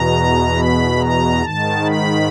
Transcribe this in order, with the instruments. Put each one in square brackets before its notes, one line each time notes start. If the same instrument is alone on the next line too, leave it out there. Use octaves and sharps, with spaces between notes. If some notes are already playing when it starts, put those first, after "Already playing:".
Already playing: [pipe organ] E2 B2 A#5
B5
A#5
G#2 D#3 A5
B5